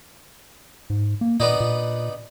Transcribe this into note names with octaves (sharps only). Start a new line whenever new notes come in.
G#2
A#3
A#2 B3 D4 D#4
A#2